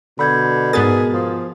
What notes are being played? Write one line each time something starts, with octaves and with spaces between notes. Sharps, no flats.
B2 D3 B5 G6 G#6
G#2 B3 G#4 A#4 A6
F3